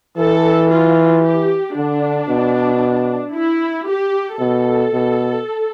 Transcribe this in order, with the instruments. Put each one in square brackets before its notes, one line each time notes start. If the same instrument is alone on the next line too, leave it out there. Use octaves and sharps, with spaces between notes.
[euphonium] E3 [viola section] A4
[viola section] F4
G4
[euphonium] D3 [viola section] D4
[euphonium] B2
[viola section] E4
G4
[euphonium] B2 [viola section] A4
[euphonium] B2